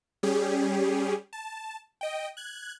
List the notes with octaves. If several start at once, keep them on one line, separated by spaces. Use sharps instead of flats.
G3 C#4 G4 G#4
A5
D#5 G5
F#6 G#6